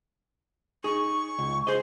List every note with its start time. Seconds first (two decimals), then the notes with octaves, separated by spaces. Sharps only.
0.84 D#4 G#4 C#6
1.39 C#2
1.67 G#4 C5 D#5